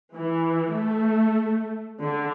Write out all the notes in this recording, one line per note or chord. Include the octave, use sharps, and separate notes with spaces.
E3
A3
D3